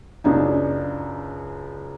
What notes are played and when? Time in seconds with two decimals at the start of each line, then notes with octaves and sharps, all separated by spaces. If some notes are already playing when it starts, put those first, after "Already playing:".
0.24 C#2 F#2 D4 D#4